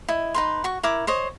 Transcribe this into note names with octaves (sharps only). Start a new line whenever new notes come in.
E4 D#5
D#4 B4 C6
F#4 C#6
E4 A#4 C#6 D6
C5 C#5 D#5